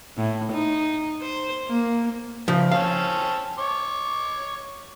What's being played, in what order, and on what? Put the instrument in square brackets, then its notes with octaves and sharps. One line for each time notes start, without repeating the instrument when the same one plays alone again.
[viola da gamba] A2
D#4
C5
A#3
[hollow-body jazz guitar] C#3 F3
[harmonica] C4 C#4 A5 [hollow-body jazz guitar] F5
[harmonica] C#5 C#6 D6